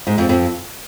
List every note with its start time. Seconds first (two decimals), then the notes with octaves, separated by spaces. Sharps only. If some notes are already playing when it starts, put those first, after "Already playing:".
0.07 G#2
0.18 F2
0.29 F2